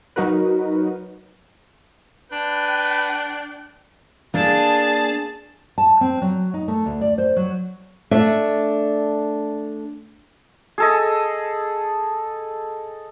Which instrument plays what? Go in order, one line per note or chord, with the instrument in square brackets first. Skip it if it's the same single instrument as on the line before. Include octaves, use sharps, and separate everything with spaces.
[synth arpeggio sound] F#3 D#4 F#4 A#4 B4
[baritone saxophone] D4 [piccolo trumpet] B4 [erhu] G5
[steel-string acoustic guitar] A#3 D4 [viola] G#4 A5
[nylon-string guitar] A5
C4
F#3
D#4
A3
D2
D5
C5
F#3
A3 D4 E5
[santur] G#4 A4 D#5